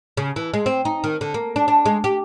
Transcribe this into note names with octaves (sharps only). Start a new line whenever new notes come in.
C#3
E3
G#3
C4
D#4
D#3
D3
A#3
D4
D4
G#3
G4